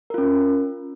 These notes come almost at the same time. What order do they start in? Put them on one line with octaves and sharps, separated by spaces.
A#4 F4 C#4